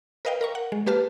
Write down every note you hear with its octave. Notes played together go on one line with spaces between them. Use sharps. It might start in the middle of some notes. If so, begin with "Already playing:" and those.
A#4 B4 D#5 F5 G5
A#4 A#5 C#6
F#5
G#3
A#3 G4 B4 A5 F6